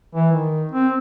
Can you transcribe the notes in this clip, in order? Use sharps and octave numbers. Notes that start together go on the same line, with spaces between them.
E3
D#3
C4